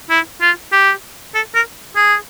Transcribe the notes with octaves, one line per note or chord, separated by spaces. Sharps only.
E4
F4
G4
A4
A#4
G#4